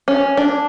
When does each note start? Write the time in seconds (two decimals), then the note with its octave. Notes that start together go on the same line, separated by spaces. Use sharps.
0.08 C#4
0.37 D4